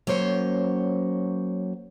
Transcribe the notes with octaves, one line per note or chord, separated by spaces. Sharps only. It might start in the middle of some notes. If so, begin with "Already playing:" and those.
F#3 A#3 C#4 C5 C#5